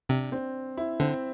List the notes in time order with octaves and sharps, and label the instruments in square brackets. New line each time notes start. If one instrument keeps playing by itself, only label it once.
[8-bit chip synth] C3 [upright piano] D4
[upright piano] C4
E4
[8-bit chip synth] D3 [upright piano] C4